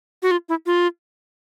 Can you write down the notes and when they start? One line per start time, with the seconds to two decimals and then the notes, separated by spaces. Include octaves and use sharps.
0.23 F#4
0.31 F4
0.49 E4
0.66 F4